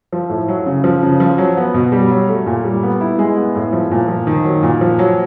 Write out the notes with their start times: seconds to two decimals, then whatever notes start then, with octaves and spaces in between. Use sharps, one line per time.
0.13 F3
0.30 A2
0.48 F#3
0.66 C#3
0.84 F3
1.03 C#3
1.20 F3
1.38 F#3
1.57 B3
1.74 B2
1.92 G3
2.11 F#3
2.29 A3
2.46 A#2
2.64 G3
2.83 B3
3.01 E4
3.19 G#3
3.37 B3
3.55 A2
3.73 F3
3.91 A#2
4.08 F3
4.27 D#3
4.44 F#3
4.63 A#2
4.81 F3
4.99 F#3